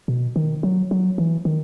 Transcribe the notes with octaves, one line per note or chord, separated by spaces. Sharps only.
B2
D#3
F#3
F#3
E3
D#3